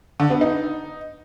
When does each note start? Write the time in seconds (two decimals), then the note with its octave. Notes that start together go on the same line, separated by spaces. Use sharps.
0.20 D3
0.30 B3
0.41 D#4